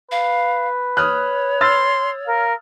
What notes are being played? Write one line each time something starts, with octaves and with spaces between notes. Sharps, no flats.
B4 F5
C#5 D#6 F6 F#6
C6 E6 F6 A6
A#4 F5